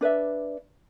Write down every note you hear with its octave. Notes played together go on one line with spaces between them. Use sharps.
D4 B4 D5 E5